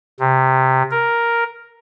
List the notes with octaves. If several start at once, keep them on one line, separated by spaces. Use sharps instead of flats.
C3
A#4